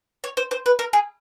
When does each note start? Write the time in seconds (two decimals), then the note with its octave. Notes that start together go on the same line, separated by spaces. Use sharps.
0.24 C#5
0.37 C5
0.51 C5
0.66 B4
0.79 A#4
0.93 G#4